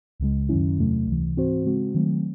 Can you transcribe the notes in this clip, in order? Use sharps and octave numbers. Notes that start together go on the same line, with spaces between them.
C#2 C#3 G#3
F#2 D#3 F#3 C#4 E4
E2 C3 F#3 A3
C#2 C3 E3
G#2 E3 C4 F#4 C5
C#3 G#3 C4 F#4
D#3 F#3 A3 C4